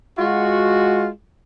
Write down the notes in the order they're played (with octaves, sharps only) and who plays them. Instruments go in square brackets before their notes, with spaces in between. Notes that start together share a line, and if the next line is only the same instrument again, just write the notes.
[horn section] G#3 F4 F#4